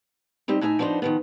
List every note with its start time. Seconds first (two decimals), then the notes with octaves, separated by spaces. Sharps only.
0.48 G3 C4 D#4 G4
0.61 A2 D#4 E5 G#5
0.79 F3 B3 D4 D#4 C5
1.02 D#3 F3 B3